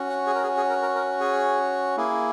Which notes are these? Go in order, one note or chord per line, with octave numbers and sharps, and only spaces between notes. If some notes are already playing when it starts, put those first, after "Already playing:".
Already playing: C#4 F#4
F#5
G#4
A#4
G#4
G#4
A#4
A#4
A#4
G#4
A#3 E4 G#4